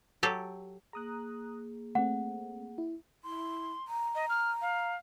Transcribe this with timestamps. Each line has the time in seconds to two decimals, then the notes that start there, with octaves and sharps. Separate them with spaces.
0.23 F#3 G4 A4
0.93 A#3 G#4 A#5 D#6 F#6
1.95 A3 C4 F#5
2.78 E4
3.24 E4 C6
3.88 A#5
4.15 D#5
4.29 F6
4.62 F5